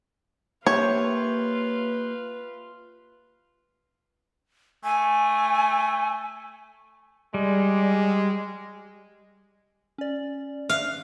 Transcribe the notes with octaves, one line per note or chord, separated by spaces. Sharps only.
A#3 F4 G4 B4 C#5 E5
A3 G#5
G3 G#3
C#4 D5
E5 F5 F#6